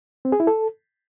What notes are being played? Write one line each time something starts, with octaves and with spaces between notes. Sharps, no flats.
C4
G#4
E4
A4